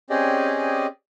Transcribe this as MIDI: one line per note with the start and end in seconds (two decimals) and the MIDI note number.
0.10 0.87 60
0.10 0.87 61
0.10 0.87 67
0.10 0.87 68
0.10 0.87 74
0.10 0.87 75